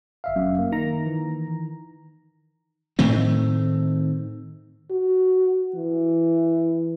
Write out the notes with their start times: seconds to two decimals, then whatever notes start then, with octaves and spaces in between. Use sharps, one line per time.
0.24 G1 E5 F5
0.36 F#2
0.59 A#3
0.72 D#3 A#5
1.06 E3
2.99 A2 D#3 A3 C4
4.90 F#4
5.75 E3